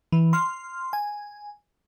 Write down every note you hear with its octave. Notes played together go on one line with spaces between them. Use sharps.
E3
C6 F6
G#5